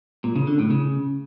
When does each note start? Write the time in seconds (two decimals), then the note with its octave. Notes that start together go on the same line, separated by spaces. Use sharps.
0.24 A#2
0.36 C#3
0.47 D3
0.59 A2
0.71 C#3